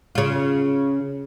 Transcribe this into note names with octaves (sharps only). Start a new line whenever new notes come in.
C#3 F4